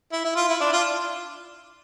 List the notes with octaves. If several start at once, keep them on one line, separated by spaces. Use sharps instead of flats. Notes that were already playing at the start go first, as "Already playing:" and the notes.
E4
E4
F4
E4
D4
F4